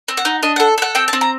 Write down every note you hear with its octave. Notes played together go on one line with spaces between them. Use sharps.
C4
F#5
D#4
D4 D#5
A4 F#5
A4 F#5
C4 G5
A5
C4
A#5